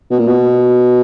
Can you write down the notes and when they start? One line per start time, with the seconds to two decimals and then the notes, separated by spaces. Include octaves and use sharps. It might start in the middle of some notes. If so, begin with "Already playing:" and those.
0.11 B2
0.19 A#2
0.28 B2